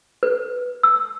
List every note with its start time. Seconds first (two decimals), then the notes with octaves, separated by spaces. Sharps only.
0.23 B4
0.83 E6